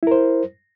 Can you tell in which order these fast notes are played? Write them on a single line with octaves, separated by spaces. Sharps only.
E4 A#4 C5